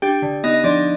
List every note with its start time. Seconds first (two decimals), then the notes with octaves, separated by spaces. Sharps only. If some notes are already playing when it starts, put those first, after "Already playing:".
0.02 D4 G4 G5
0.22 D3
0.44 B3 D#4 D#5
0.54 D#5
0.64 F3 D4 D5